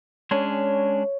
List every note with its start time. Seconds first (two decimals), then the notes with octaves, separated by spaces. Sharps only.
0.31 G#3 C#4 D4 C#5